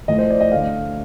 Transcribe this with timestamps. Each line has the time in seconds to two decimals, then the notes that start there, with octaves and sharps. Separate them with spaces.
0.08 A2 F3 A3 D#5
0.18 C5
0.30 D5
0.40 D#5
0.52 D2 D3 A3 F5